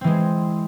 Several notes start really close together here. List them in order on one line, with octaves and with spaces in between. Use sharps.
C4 E3 G#3